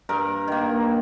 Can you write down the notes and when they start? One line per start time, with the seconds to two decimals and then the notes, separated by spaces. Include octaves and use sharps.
0.09 G2 A#4
0.48 D#3 A#3